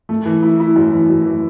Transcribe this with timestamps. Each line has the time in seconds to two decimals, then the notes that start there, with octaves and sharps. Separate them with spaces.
0.09 A3
0.26 E3
0.43 E4
0.60 E4
0.76 F#2
0.93 E3
1.09 F#2
1.25 E3